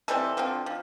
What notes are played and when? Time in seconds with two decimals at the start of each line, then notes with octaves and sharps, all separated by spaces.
0.08 E3 G3 C4 A4
0.37 D3 F3 C4
0.66 F3